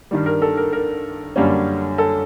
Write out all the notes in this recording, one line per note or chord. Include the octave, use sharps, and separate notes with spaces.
G2 D#3 G3
A#4
A4
A#4
A#4
F#2 D3 G3 A#3 C#4
A4